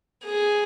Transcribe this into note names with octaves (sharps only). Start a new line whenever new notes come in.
G#4